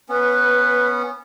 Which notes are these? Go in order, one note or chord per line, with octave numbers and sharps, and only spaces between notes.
B3 C#4 B4